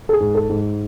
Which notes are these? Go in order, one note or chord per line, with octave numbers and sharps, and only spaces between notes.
A4
G#4
G#2
A4
G#2